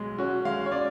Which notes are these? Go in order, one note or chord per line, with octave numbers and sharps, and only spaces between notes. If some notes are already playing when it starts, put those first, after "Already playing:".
Already playing: B1 G#3
C#4 F#4
G#3 F5
C#5
C#4 D5